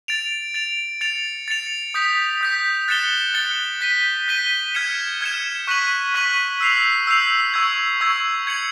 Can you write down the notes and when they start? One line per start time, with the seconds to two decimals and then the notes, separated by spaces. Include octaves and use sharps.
0.08 A6 D7 F7
0.54 A6 D7 F7
1.01 A6 C#7 F7
1.48 A6 C#7 F7
1.94 D#6 G6 B6
2.41 D#6 G6 B6
2.88 F#6 A6 C#7 E7 G7
3.34 F#6 A6 C#7 E7 G7
3.81 G6 B6 D#7 G7
4.28 G6 B6 D#7 G7
4.74 F6 G#6 C#7 E7
5.21 F6 G#6 C#7 E7
5.67 C#6 F#6 B6 D#7 F#7
6.14 C#6 F#6 B6 D#7 F#7
6.61 E6 G6 C7 F7
7.07 E6 G6 C7 F7
7.54 C#6 E6 G#6
8.01 C#6 E6 G#6
8.47 G#6 C#7 F#7